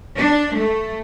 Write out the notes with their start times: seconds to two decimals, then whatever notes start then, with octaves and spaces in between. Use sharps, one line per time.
0.17 D4
0.56 A3